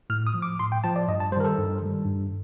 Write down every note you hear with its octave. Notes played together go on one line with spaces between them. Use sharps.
A2 F6
D#6
F3
D6
A2 C6
G5
F3 A5
D5
G2 D#5
A5
G3 C5
D#3 A#4
A4
G2
D#3 G3
G2